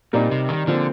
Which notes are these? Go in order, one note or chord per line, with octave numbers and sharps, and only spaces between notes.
A#2 G3 C4 D#4 A#4 D5
C3
D#3
A#2 D3 F3 C4